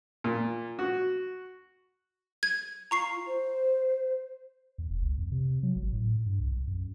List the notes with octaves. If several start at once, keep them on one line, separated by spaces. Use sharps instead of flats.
A#2
F#4
G#6
F4 A#5 C#6 C7
C5
E2
F1
C#2
F2
C3
F#3
G#1
A2
G2
C2
B1
F#2